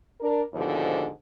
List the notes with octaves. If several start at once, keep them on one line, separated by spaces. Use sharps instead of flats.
D4 A#4
D#2 G#2 B2 D3 F3